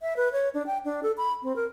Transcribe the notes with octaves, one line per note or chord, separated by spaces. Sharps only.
E5
B4
C#5
D4
G5
D4
A4
B5
C4
A#4